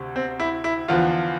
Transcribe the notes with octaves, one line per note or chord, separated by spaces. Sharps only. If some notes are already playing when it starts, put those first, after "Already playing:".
Already playing: D2 C3
C4
E4
E4
E2 D3 F3 F4